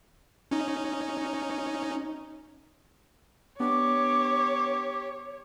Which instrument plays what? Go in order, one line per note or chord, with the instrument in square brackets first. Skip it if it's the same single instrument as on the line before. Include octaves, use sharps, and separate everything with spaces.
[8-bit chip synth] C#4 D#4
[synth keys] B3 D4 [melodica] G4 [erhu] C#5 [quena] D6